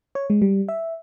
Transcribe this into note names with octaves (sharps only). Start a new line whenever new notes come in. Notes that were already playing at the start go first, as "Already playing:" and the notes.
C#5
G#3
G3
E5